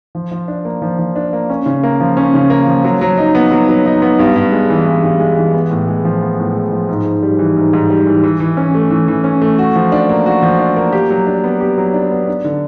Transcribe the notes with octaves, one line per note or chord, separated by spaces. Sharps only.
F3
F3
D4
A#3
F3
F3
D4
A#3
C#4
C#3
A#3
F3
C#4
C#3
A#3
F3
F#3
F#3
D#4
B3
F#3
F#3
D#4
B3
G2
G2
G#3
E3
G2
G2
G#3
E3
B3
A2
G#3
F3
B3
A2
G#3
F3
G#2
G#2
G3
E3
G#2
G#2
G3
E3
E3
E3
C#4
A3
E3
E3
C#4
A3
F#4
F3
D4
A#3
F#4
F3
D4
A#3
G4
F#3
D4
B3
G4
F#3
D4
B3
D4
D3